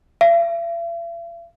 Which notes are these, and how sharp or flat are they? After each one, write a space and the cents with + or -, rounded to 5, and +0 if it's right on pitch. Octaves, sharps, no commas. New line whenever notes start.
E5 +45